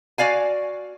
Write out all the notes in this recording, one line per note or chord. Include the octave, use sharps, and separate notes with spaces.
F#4 D5 F5 G#5